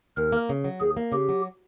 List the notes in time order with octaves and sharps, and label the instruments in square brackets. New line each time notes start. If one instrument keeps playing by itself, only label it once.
[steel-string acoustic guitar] D#2 [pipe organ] A#4
[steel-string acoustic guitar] A#3
C#3
F#3
[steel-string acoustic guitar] D#2 [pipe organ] G#4
[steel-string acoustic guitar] A#3
[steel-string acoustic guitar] C#3 [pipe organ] G4
[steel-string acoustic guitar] F#3